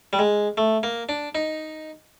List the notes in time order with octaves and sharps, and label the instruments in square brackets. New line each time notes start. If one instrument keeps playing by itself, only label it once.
[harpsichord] G3
G#3
A3
A#3
D4
D#4